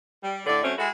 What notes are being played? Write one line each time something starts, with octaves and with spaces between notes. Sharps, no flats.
G3
A2 D3 D5
F#3 A3 C4 C#4
G#3 E4 F#4 A4